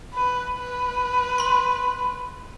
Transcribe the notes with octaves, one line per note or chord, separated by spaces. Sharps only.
B4
B4
B5 C6